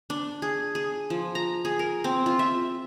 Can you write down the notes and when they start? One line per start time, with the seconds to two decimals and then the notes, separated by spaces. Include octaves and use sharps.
0.10 D4
0.42 G#4
0.75 G#4
1.10 F3
1.35 A#5
1.65 G#4
1.79 A#4
2.04 C4
2.26 F4
2.39 E5